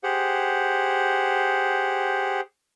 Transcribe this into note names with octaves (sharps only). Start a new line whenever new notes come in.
G4 G#4 C5 F#5